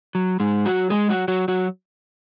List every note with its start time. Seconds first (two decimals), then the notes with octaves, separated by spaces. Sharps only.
0.15 F#3
0.40 G#2 G#3
0.65 F#3 F#4
0.90 G#3 G#4
1.09 F#3 F#4
1.28 F#3 F#4
1.48 F#3 F#4